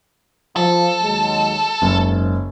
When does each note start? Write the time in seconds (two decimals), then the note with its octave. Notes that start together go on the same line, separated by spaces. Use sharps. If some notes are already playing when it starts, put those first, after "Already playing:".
0.56 F3 A4
1.02 D#2 F#3 G#3
1.82 F#1 G#2 C#3